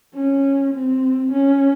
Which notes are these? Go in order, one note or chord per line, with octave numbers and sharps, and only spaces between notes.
C#4
C4
C#4